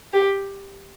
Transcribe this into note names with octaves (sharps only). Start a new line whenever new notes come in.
G4